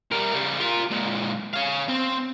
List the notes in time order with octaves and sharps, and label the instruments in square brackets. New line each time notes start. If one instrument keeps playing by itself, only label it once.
[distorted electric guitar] G3 A#4
C#3 G3
F4 A#4
A#2 G#3
C#5 F5
C4